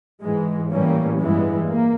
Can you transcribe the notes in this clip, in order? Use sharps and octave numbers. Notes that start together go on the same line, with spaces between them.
G#2 E3 G#3
A2 E3 G3 A#3 C#4
G2 E3 G#3 B3
A#3